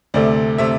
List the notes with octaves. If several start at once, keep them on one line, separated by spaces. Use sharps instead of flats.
D2 C3 A3 D5
C3 A3 E5